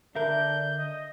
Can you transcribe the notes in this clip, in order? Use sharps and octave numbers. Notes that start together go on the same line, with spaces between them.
D3 D4 A#4 E5 G6
D#5